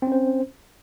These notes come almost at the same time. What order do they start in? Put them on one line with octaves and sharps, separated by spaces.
C4 C#4 C5